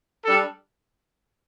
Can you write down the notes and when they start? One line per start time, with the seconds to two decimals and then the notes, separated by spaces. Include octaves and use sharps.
0.25 G3 D4 A4